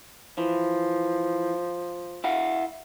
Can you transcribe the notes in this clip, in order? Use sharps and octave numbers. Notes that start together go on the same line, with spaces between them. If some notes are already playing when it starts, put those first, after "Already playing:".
E3 F3
E4 F5 F#5